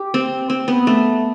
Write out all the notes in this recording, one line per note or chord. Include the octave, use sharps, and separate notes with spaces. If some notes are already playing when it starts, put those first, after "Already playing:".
Already playing: G4
C4
C4
B3
A3